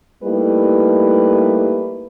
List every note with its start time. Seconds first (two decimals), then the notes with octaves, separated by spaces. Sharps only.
0.23 G3 A3 A#3 D#4 E4 B4